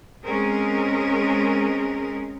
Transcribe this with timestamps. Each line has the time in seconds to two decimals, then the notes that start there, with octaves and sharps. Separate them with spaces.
0.23 G#3 C4 C#4 G#4 A#4